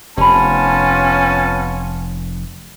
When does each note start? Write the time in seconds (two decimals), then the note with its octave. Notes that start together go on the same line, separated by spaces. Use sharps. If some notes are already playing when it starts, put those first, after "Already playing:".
0.17 F1 B3 C#4 F4 G4 A5 B5